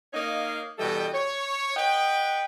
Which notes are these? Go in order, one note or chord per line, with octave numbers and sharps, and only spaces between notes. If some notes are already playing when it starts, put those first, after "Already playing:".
A#3 D#4 C#5 D#5 F5
B2 E3 G3 A4 D#5 G5
C#5
B4 D#5 F#5 G5